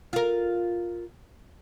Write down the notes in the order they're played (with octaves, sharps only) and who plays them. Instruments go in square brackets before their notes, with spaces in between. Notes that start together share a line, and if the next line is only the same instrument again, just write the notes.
[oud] F4 A#4